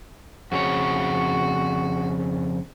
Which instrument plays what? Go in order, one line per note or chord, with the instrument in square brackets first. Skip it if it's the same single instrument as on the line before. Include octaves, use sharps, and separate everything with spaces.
[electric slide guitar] F2 C#3 C#5 [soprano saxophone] F#4